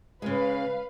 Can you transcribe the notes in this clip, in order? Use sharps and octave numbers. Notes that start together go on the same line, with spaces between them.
C#3 G#3 B4 F5